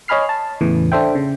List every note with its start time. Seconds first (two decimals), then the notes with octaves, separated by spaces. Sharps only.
0.08 C#5 D#5 G#5 B5 F6 C7
0.29 A5
0.61 E2 A2 C#3 E3
0.92 D4 A4 C5 E5 G5
1.15 C#3